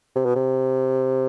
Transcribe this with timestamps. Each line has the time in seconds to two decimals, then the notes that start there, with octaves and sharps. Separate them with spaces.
0.16 C3
0.25 B2
0.36 C3